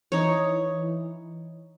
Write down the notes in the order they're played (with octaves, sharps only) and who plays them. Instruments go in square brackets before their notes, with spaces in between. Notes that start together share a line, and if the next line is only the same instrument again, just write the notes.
[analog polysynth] E3 [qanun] D#4 C#5